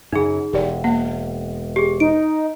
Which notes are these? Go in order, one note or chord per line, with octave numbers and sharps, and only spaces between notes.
F#2 C#3 D#4 G#4
E1 G4 D5
A#3 F#5
G4 G#4
D#4 D7